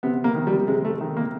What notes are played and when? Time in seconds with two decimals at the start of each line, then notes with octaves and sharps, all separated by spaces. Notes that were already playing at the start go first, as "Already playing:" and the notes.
0.03 C3 B3
0.24 A#3
0.35 D#3
0.47 G3
0.68 C3 G#3
0.85 A3
1.01 D#3
1.17 A#3